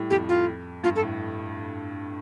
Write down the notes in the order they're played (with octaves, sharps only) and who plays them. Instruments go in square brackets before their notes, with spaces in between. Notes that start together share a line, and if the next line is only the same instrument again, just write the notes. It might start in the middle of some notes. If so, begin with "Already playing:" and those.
Already playing: [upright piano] A2 G3
[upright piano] F2 [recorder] G4
[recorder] F4
[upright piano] G2 [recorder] F4
[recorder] A4
[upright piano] A2